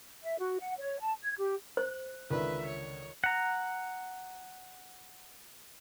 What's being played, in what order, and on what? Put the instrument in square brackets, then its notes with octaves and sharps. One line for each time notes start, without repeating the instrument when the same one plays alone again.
[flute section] E5
F#4
F#5
C#5
A5
G#6
G4
[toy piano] C5 [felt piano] F#6
[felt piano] C#2 D3 [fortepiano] D#3 [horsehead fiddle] B4 E5
[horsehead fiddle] C#5
[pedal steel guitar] F#5 A#5